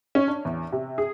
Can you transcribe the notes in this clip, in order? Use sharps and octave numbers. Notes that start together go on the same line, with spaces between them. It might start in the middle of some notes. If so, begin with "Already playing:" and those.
C#4
D4
E2
C3
G#4